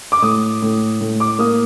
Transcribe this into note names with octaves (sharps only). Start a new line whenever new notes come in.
D6
A2 D#6
A2
A2
D6
A#3 D#6